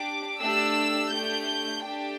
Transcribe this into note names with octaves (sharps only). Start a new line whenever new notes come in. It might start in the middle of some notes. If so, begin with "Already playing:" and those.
Already playing: D4 G4 D6
A3 D4 G4 E6
A3 D4 G4 G6
A3 D4 G4 G5